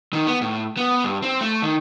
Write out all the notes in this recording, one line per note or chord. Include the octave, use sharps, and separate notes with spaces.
D#3
B3
A2
B3
G2
C4
A3
D#3